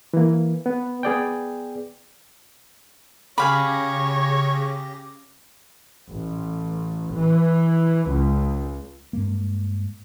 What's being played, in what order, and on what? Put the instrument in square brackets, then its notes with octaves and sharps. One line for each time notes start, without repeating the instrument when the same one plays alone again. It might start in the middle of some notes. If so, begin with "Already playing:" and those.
[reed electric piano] E3 A#3
B3
B3 G#4 D5 G5
[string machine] C#3 A#6 [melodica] G4 [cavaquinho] G#4 F5 B5 [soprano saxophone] C#5
[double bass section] A1
E3
C#2
[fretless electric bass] G2 G#3 A#3